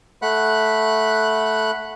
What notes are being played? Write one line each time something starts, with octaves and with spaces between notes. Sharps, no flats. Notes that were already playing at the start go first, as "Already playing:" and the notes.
A3 F#5 B5 F#6